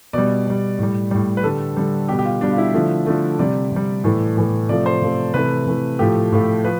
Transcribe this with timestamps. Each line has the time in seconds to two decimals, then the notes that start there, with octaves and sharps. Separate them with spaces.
0.13 B2 G3 D5
0.47 B2 G3
0.79 A2 G3
1.11 A2 G3
1.37 B4
1.43 D3 G3 A4
1.77 D3 G3
2.08 B2 G3 G4
2.19 G4
2.25 F4
2.41 B2 G3 D4
2.52 F4
2.58 E4
2.74 D3 F3 A3
3.06 D3 F3 A3
3.39 C3 G3 D5
3.72 C3 G3
4.04 A2 E3 A3
4.37 A2 E3 A3
4.69 C3 F3 A3 D5
4.86 C5
5.02 C3 F3 A3
5.34 C3 E3 A3 B4
5.67 C3 E3 A3
5.99 A2 F3 A3 G4
6.32 A2 F3 A3
6.65 F3 B4